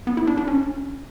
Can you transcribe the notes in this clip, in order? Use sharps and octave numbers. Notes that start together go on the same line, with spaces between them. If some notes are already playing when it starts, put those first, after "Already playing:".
B3
E4
D4
D4
C#4